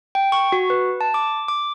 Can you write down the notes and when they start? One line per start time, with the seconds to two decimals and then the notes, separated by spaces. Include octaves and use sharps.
0.15 G5
0.32 C#6
0.52 F#4
0.70 B4
1.01 A5
1.14 D6
1.48 D6